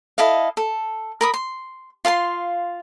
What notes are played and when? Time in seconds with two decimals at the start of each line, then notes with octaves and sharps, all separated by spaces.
0.18 E4 A4 D#5 F5
0.57 A4
1.21 A#4 B5 D#6
1.34 C6
2.05 F4 F5 A5 C6